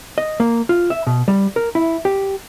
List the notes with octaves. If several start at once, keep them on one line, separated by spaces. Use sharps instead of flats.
D#5
A#3
F4
E5
B2
G3
A#4
E4
G4